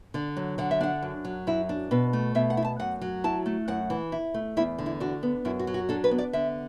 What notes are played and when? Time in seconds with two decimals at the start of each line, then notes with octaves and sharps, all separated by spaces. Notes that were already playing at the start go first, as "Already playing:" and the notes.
0.14 D3 D5
0.37 F#3
0.58 D3 F#5
0.71 E5
0.81 D4 F#5
1.02 F#2
1.25 F#3
1.47 F#2 E4
1.69 D4
1.91 B2 B4
2.13 A3
2.35 B2 E5
2.50 F#5
2.57 E4
2.65 A5
2.80 F#2 F#5
3.02 F#3
3.24 E4 A5
3.46 A3
3.68 F#2 F#5
3.90 E3
4.12 E4
4.34 A3
4.57 E2 E4
4.78 D3
4.86 E4
5.00 D4 F#4
5.23 B3
5.45 F#2 E4
5.59 F#4
5.67 F#3
5.74 F#4
5.89 D4 A4
6.04 B4
6.11 B3
6.18 D5
6.33 D3 E5